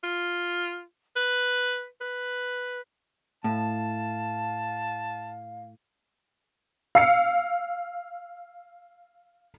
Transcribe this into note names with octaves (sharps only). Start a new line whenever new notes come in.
F4
B4
B4
A2 F5 A5
F5 E6 C7 C#7